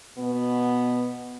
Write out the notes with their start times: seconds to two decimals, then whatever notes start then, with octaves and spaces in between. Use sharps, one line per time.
0.18 B2 B3